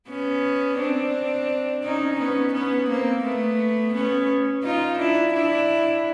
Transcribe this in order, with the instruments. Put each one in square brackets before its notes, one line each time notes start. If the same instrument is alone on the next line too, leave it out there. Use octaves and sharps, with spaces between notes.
[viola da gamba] B3 C#4
C4 D4
C#4 D#4
B3 C#4
B3 C#4
A#3 C4
A3 B3
B3 C#4
D#4 F4
D4 E4
D4 E4